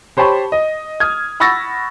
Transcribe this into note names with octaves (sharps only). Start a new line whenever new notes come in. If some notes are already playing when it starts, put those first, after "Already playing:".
G4 C5 C#5 A5 B5 C#6
D#5
D#6 F6 G#6
F#5 B5 C#6 E6 A6 A#6